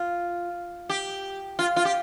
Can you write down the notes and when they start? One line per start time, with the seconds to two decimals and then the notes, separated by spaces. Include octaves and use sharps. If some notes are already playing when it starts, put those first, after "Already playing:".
Already playing: F4
0.89 G4
1.59 F4
1.76 F4
1.85 G4